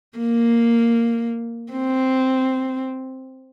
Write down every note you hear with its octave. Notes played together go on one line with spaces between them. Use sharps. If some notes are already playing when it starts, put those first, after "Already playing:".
A#3
C4